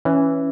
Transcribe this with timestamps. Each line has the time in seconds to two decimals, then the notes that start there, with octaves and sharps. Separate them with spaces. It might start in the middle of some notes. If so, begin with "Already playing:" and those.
0.05 E3 C#4